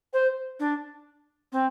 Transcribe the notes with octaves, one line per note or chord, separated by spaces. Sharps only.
C5
D4
C4